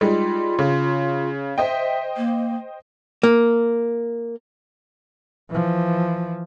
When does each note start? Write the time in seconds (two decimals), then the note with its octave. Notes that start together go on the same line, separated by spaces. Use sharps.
0.01 G3 G#3 D#4 F4
0.59 C#3
1.58 C5 D#5 E5 G5
2.17 A#3
3.23 A#3
5.50 E3 F3